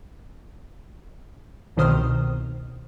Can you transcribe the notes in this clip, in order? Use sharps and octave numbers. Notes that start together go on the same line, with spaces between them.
C2 B2 D#3 C5 D#6 F6